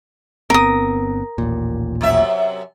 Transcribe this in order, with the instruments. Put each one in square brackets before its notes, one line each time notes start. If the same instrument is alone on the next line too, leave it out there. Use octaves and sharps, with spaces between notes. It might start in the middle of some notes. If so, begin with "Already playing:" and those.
[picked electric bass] G1 B3 C4 [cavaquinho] A#4 D#6
[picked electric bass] A1 D#2 A#2
[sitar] F#2 C3 E5